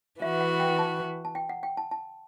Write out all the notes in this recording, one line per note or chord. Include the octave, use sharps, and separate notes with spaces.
E3 B3 F#4 E5
F#5
G5
A5
A5
G5
F#5
G5
A5
A5